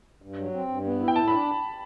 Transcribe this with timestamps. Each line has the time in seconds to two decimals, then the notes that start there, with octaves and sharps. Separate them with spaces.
0.22 G2
0.37 F#3
0.53 C4
0.68 G2
0.84 B3
1.00 E4
1.08 G5
1.15 A2 A5
1.28 B5
1.32 D4